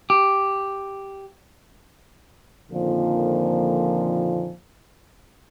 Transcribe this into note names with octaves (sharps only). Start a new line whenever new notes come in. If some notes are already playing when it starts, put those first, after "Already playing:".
G4
F2 A#2 D3 D#3 F3 A#3